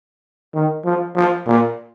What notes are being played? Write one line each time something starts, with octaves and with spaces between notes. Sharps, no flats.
D#3
F3
F3
A#2